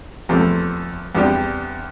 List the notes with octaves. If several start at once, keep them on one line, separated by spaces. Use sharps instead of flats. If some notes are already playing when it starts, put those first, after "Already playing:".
E2 C3 F3 A3
E2 C3 G3 D4 G4